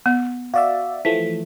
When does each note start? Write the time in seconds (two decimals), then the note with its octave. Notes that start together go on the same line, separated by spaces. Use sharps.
0.06 B3
0.54 F#4 D5 E5 F5
1.05 E3 F3 A3 B6